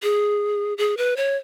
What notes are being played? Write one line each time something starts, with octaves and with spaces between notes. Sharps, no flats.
G#4
G#4
B4
C#5